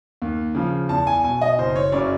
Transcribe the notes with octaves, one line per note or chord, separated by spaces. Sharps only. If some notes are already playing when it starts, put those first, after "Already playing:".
D#2
C#3 F3
E2 A5
G#5
B2 G#5
D#5
F#1 C5
C#5
F#2 C#3 D5